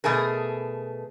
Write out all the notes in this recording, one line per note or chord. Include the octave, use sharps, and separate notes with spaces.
B2 A3 G#4 A#4